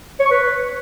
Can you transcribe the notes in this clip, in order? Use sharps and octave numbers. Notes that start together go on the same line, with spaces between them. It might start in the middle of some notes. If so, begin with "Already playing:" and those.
C#5
C#6
B4